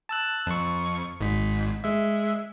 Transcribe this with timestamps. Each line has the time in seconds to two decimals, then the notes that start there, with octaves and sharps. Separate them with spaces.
0.09 A5 E6 F#6
0.47 F2 C#6
1.21 G#1 G#2 B6
1.84 G#3 E5